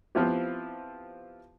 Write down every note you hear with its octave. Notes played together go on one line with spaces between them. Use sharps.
F3 B3 C4 E4 F4 G4